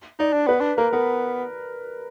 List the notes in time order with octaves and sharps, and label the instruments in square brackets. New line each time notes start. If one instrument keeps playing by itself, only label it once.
[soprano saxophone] D#4 [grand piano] D5
[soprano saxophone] D4
[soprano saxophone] B3 [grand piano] B4
[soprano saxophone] D4
[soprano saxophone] A#3 [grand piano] A#4
[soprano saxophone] B3 [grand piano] A#4